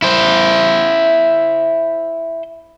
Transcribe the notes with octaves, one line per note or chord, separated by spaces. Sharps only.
E4 C5